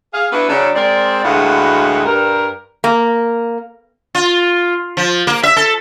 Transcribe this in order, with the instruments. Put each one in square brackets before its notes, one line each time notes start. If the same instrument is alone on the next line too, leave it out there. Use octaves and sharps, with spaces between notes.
[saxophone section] G#4 F5
B3 D4 E4 F#4 B4
C#3 F#3 D4
G#3 C4 A#4 C5 D5
D2 A2 G#3 B3 F#4 F5
G2 A#4
[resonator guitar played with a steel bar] A#3
[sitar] F4
F3
A#3
E5
A4